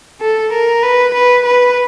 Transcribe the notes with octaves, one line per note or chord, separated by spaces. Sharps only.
A4
A#4
B4
B4
B4